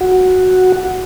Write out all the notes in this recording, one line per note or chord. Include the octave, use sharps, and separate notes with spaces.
F#4